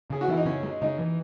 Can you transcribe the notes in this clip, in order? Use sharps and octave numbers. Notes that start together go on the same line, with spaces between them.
C#3 G#4
F#4
E3 E4
D#4
C#3 C#4
G#3
C#3 D#4
E3